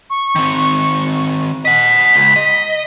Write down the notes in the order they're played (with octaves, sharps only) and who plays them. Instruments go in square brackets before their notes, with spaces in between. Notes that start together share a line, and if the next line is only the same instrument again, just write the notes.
[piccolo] C#6
[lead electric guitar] D#3 C4
[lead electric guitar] D#5 F#5 [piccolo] B6
[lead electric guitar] C#2
D#5